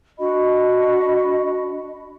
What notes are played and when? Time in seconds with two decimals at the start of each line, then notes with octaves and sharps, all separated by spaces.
0.19 D4 F#4 D#5 B5